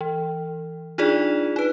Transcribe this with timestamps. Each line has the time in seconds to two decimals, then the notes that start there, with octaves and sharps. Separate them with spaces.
0.01 E3
0.98 D4 D#4 F4 G#4 D5
1.56 D#4 B4